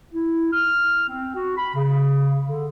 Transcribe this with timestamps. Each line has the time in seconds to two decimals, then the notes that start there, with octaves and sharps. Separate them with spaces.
0.13 E4
0.53 F6
1.08 C4
1.36 F#4
1.57 B5
1.75 C#3
2.46 D3